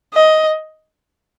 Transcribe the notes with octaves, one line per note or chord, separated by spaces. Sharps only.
D#5